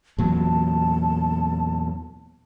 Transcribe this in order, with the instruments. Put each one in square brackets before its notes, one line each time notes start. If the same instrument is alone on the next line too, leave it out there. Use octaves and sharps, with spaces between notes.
[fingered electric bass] E2 A#2 F#3 [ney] A5